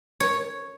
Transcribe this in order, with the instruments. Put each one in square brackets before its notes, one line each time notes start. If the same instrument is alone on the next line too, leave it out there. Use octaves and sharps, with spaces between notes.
[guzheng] C#5